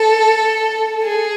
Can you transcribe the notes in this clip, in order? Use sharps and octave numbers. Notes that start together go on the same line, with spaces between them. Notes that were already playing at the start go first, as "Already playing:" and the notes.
Already playing: A4
G#4